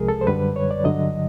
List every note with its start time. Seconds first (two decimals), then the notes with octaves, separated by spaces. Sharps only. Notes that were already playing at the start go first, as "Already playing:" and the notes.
Already playing: C2 C3 F3 G#3 G#4 A#4
0.08 A4
0.21 C5
0.27 F#2 D3 G3 B4
0.56 C#5
0.71 D5
0.84 G2 D3 F#3 D#5